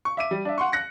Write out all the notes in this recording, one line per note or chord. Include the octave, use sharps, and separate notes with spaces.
C#6
E5 D6 D#7
G3
D4 E5
F#5 C6 C#6
F#6 A#6 C#7